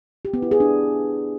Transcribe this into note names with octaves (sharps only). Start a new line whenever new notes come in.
G4
B3
E4
G#4
D4